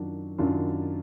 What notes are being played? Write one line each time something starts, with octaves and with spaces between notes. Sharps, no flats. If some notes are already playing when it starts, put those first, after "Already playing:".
Already playing: F#2 D#3 F#3 D4 F4
F#2 D#3 F#3 D4 F4